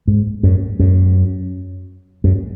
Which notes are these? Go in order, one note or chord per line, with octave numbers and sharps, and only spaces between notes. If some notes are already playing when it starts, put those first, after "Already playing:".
G#2
F#2
F#2
F#2